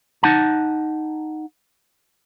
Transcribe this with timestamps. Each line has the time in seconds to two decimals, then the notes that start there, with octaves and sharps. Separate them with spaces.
0.23 D#4 F#5 A5